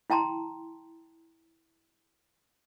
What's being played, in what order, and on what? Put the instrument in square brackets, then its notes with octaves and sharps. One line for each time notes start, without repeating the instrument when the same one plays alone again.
[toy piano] E4 G5 A5 A#5 C6